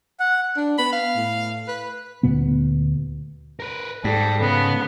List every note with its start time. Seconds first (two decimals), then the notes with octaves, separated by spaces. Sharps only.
0.20 F#5
0.57 D4
0.78 B3 B5
0.93 F5
1.16 A2
1.68 B4
2.23 D2 A#2 B3
3.60 A#4 B4
4.04 G#2 G3 A4
4.41 C#3 B3